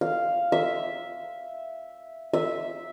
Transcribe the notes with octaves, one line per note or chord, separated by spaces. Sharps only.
F5
E5
E5